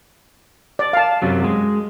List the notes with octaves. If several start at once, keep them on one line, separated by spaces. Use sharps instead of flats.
D5
F5 A5
F#2 C3 F#3
G#3